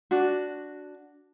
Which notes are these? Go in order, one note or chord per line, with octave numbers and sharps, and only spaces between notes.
D4 F#4